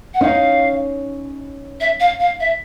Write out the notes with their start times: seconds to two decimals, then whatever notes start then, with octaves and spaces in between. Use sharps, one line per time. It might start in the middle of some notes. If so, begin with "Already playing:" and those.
0.13 F#5
0.21 C#4 D#4 F5
1.80 E5
2.00 F5
2.19 F5
2.40 E5